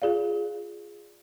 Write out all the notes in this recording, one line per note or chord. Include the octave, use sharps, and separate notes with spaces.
F4 G#4 D5 F5